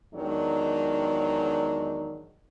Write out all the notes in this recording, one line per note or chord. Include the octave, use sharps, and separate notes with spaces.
E2 D#3 F#3 G#3 D4